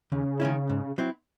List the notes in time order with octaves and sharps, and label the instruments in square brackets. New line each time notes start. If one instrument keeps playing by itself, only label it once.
[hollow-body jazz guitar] D#2 [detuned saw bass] C#3
[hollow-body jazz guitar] D#3 G#3 C#4 E4
G#2
F#3 C4 E4